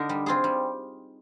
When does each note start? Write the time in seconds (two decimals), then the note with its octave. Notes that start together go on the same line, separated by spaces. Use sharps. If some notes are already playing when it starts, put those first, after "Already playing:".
Already playing: D3 D#4 A#4
0.09 G3
0.26 C4 F4 G#4
0.44 G3